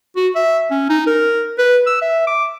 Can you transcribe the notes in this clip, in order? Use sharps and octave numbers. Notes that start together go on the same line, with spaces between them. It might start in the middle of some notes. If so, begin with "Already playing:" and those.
F#4
E5
C#4
D#4
A#4
B4
E6
E5
D6